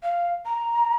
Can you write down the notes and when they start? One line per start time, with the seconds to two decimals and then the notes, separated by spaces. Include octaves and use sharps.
0.03 F5
0.45 A#5